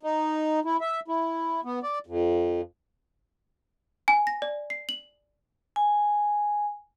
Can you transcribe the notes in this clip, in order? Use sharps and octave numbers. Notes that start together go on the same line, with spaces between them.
D#4
E4
E5
E4
B3
D5
F2
G#5
A#6
D5
C7
F#7
G#5